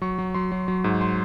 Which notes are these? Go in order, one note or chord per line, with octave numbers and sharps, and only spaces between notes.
F#3 C#6
F#3
F#3 C6
F#3
F#3
G#2
C6